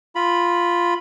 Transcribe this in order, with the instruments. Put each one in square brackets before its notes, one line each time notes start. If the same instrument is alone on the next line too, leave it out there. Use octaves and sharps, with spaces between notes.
[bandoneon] F4 B5